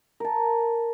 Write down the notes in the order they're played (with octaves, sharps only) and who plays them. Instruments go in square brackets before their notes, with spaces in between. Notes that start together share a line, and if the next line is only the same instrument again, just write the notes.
[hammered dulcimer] A#4 A5